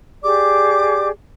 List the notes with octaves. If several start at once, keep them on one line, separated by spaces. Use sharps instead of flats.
G4 G#4 D5 D6